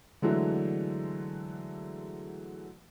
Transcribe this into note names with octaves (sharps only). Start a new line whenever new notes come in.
D3 E3 F#3 G#3 A3